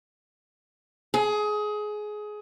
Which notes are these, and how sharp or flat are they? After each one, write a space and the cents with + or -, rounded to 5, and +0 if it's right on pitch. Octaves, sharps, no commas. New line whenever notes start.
G#4 +20